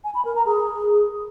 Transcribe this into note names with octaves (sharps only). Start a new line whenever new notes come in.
G#5
B5
A#4
A#5
G#4